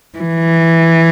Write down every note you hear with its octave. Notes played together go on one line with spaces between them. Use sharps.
E3